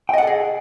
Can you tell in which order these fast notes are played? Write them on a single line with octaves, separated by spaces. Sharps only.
G5 D#5 F#5 A4 G#4